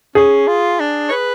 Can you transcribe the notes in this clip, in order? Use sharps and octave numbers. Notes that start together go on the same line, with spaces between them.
C#4 G#4
F4
D4
C#5
B4